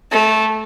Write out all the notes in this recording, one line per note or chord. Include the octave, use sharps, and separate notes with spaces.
A3